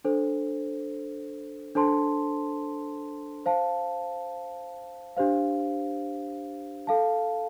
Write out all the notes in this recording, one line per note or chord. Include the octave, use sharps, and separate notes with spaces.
D4 A4 C5
D4 A4 C5 A5 C6
C5 F5 A5
D4 G4 C5 F5
A4 F5 A5